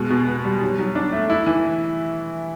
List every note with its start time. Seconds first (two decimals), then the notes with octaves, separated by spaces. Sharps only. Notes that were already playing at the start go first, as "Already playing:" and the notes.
Already playing: B2 G#3
0.10 B2
0.27 B3
0.44 G3
0.62 F#3
0.79 F#3
0.95 D4
1.12 A3
1.30 E4
1.47 E3